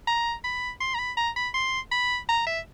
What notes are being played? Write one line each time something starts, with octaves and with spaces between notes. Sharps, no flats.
A#5
B5
C6
A#5
B5
A#5
B5
C6
B5
A#5
E5